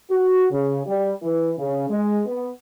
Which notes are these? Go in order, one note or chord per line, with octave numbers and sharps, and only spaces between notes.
F#4
C#3
G3
E3
C#3
G#3
B3